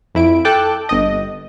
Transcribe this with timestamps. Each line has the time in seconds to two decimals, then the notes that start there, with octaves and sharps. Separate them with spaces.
0.15 F2 E4 D7
0.45 A4 G5 A5 D6 F#6
0.89 G1 D#5